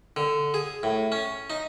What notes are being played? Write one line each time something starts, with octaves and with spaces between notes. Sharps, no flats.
D3
G#4
A2
C#4
D#4